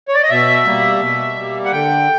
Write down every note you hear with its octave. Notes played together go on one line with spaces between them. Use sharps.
C#5
D5
D#5
B2 E5
G3 A#3
B2
G3 A#3
F#5
D3 G5